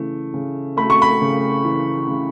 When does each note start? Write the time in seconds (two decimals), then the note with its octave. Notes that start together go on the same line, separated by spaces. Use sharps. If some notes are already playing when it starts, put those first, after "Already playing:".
Already playing: C#3 E3 A3
0.34 C#3
0.77 A3 B5
0.90 C#6
1.02 B5
1.21 C#3
1.65 E3
2.08 C#3